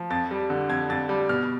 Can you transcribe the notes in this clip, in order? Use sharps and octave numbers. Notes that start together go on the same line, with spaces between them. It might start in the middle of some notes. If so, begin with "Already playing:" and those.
Already playing: F3
F2 A6
G3
D3
F2 G#6
F2 A6
G3
B2 F6